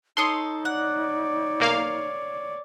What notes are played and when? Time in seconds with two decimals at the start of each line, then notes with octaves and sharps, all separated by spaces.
0.17 D#4 A4 C#5 C6 D#6
0.65 C#5 D5 F#5
1.60 B1 A#3 F5